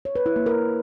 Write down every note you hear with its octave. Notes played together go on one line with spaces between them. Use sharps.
C#5
B4
E4
A#3
A#4